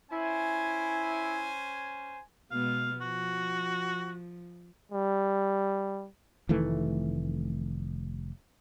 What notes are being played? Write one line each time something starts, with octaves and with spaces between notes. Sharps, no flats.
C#4 E4 C5 G#5
B2 G#3 B3 F5
F3 F#4
G3
F1 D#3 E3 A3